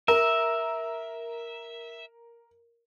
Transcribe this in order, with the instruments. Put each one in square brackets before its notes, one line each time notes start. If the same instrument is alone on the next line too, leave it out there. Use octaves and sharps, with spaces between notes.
[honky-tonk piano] A#4 [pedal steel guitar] E5